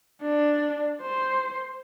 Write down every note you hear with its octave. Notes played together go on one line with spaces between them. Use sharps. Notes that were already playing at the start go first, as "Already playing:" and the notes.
D4
C5